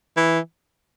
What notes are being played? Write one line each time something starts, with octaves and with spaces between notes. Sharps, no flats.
E3